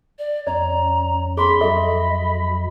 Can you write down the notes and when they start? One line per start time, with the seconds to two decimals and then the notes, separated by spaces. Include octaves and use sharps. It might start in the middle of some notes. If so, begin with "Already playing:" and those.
0.19 D5
0.47 F2 C#4 D5 A#5
1.37 G#4 B5 C6
1.61 F2 F#3 A4 D#5 E5